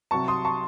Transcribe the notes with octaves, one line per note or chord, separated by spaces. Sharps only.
C2 C3 F#3 A5 C#6
C6 D#6
A5 C#6